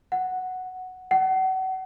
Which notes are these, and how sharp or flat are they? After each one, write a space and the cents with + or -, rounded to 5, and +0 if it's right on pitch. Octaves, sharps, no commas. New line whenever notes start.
F#5 +0
F#5 +35